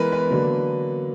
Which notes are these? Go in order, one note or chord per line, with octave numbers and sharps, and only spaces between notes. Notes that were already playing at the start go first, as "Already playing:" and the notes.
Already playing: E3 G#3 B3 A#4 B4
B4
D3 F#3 A#3